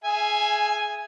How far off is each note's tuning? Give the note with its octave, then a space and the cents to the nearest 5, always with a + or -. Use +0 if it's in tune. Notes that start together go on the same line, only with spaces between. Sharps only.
G#4 +20 E5 +20 G#5 +0